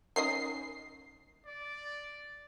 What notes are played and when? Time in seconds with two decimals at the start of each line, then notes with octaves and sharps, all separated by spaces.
0.16 D#3 C#4 D#5 C7
1.46 D5